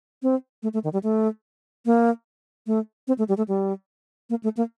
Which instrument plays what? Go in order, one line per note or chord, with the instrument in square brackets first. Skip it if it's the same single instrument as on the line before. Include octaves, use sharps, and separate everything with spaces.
[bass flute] C4
A3
A3
D#3
G3
A3
A#3
A3
C4
A3
G3
A3
G3
A#3
A3
A#3